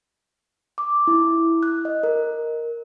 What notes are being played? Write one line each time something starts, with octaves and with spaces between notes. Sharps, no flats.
D6
E4
F#6
D#5
A#4